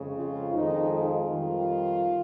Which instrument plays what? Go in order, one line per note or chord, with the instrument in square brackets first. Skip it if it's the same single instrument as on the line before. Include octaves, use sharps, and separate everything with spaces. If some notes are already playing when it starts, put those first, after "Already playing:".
Already playing: [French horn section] F2 C#3 G#3
F4
F2 D#3 G#3 D#4
F4
F2 D#3 G3